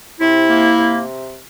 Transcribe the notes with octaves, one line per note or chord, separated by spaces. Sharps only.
C3 E4
A#3
C3